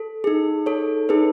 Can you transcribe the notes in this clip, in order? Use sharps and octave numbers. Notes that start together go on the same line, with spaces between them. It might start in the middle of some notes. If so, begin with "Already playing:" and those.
Already playing: A4
D#4 G#4
A4 C#5
D#4 G#4 B4